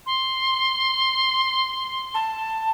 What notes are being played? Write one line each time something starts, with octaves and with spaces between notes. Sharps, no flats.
C6
A5